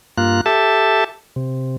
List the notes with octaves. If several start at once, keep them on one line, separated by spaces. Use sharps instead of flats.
G2 A#3 F4 F#6
G4 A4 E5 A5
C3